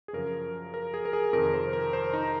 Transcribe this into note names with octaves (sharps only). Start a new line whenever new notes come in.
G#4
F#2 C#3 F3 A#4
A#4
G#4
A#4
G#4
F2 C3 D#3 A#4
C5
A#4
C5
D#4